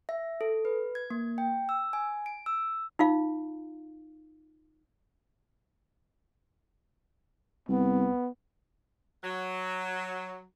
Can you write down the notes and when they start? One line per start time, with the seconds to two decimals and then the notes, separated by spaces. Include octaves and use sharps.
0.09 E5
0.41 A4
0.65 B4
0.95 G#6
1.10 A#3
1.38 G5
1.69 E6
1.93 G#5
2.26 D7
2.46 E6
2.99 D#4 F4 F5
7.69 C2 B3
9.24 F#3